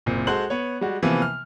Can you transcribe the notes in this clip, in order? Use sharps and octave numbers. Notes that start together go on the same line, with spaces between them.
F#1 A#2 C4
G#3 F#4 A4 C5 F#6 F#7
B3 C#5
G3 G#3 F#4
C3 E3 F3 A#3 B3
F6